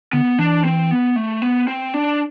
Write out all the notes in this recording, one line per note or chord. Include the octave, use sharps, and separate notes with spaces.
D3 B3
E3 D4
C4
B3
A3
B3
C4
D4